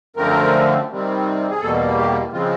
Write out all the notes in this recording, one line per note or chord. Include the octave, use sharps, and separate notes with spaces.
F#2 D3 F3 A3 C4 A#4
C3 D#3 G3 C4
G#4
E2 B2 G3 A#3 A4
G4
C#3 F3 G#3 C4 F4